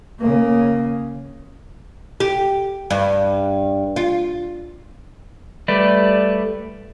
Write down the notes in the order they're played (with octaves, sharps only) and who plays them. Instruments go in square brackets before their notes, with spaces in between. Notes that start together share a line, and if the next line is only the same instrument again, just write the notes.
[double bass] C#3 A#3
[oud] G4
G2
F4
[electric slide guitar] G3 A3 B4 D5